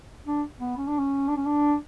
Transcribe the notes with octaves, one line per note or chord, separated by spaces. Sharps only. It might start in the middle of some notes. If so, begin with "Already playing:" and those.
D4
B3
C#4
D4
C#4
D4
C#4
D4